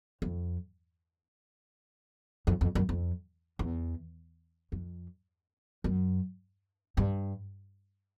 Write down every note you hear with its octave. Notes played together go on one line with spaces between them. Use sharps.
F2
F2
F2
F#2
F2
E2
F2
F#2
G2